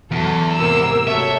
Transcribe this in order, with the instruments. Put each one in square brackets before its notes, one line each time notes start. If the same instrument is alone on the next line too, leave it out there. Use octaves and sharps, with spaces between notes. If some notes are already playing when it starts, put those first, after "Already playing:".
[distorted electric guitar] E2 [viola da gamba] E3 F#3 A4
[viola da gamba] G#2 C3 A#3 [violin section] A#4 E6
[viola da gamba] A3 F#4 A4 [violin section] C#5 [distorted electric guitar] E5